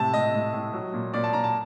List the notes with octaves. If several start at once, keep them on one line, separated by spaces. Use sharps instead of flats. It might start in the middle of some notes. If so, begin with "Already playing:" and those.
Already playing: A2 C3 A5
A2 D#5
A2
A2
F#3
A#2
A#2 D5
A5
A#2 A#5
A5